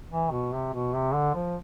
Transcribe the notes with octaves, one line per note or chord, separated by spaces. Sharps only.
E3
B2
C3
B2
C3
D3
F3